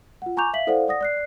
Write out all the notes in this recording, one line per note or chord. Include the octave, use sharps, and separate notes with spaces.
F4 F#5
G#5 A#5 C#6 D6 G6 F7
E5 F5 B6 F#7
E4 A4 C5 D5 F5 F#5
D5 F#5 D#6 A#6
D5 F#6 C7